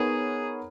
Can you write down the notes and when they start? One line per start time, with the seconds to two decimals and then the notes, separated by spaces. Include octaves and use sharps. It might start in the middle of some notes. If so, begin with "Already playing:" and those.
Already playing: B3 D#4 G#4 A#4 C#5